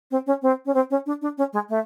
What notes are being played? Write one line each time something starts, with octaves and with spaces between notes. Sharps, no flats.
C4
C#4
C4
C#4
C4
C#4
D4
D4
C#4
G#3
A3